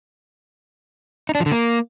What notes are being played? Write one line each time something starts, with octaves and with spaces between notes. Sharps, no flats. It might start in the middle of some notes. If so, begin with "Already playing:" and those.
D#4
D4
F3
D3
A#3